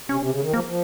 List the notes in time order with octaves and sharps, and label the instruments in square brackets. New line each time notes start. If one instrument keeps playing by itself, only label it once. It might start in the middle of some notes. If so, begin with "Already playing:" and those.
[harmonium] C3 [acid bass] C#4
[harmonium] C3
C#3
D#3
[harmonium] F3 [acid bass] A#3
[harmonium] F3